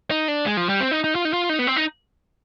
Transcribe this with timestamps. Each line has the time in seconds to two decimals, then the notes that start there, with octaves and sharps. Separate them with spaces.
0.11 D#4
0.28 D4
0.46 G#3
0.57 F3
0.69 G3
0.80 C4
0.91 D#4
1.04 D#4
1.15 F4
1.25 D#4
1.33 F4
1.49 D#4
1.59 B3
1.67 C4
1.76 D#4